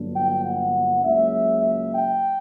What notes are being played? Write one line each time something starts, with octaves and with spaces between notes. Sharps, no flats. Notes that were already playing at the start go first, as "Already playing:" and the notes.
Already playing: G1 G2 F#3 A#3 D4
G5
F#5
C#2 C#3 F#3 A#3 E5
E5
G5